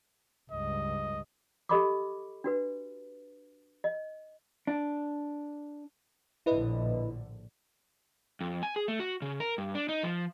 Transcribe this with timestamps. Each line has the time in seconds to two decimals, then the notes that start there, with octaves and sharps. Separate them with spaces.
0.51 C#2 G2 D#5
1.69 G4 A4 D#5 B5 C#6 D6
2.44 D4 F#4 B4
3.84 D#5
4.67 D4
6.46 A#1 A2 D3 E4 B4 D#5
8.41 F2
8.63 G#5
8.76 G#4
8.88 A3
9.00 F#4
9.22 C#3
9.40 A#4
9.58 G2
9.75 D4
9.89 D#4
10.03 F3